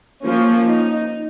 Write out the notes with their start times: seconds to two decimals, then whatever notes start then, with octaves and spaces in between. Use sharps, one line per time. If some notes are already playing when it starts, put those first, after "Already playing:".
0.24 F3 A#3 C#4
0.67 D#4